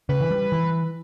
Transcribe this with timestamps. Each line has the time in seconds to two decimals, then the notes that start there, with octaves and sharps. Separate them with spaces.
0.09 C#3 B4
0.21 E3
0.31 G3
0.52 E3